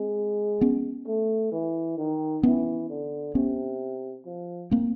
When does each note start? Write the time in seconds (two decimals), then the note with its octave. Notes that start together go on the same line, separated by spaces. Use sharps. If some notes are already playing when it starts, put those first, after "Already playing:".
Already playing: G#3 C4
0.61 B3 C#4
1.07 A3
1.52 E3
1.98 D#3
2.43 E3 B3 C#4
2.89 D3
3.35 C3 B3 C#4
4.26 F3
4.71 A#3 C4